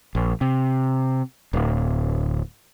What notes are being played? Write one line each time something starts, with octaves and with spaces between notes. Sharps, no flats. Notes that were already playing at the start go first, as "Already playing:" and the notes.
A#1
C3
D1